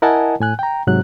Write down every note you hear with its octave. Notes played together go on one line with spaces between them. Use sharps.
E4 A#4 D#5 F#5 G#5 A5
A2 G#5 F#6
G5 A#5
G#2 C3 F#3 F#6